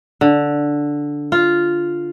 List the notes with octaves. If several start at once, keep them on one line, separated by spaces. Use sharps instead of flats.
D3
F4